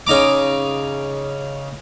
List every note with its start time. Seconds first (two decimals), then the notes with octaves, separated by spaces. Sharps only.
0.07 C#3 D#4 A#5 D6